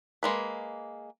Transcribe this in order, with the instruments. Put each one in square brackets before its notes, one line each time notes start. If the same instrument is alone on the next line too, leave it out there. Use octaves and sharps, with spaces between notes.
[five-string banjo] G#3 A#3 B4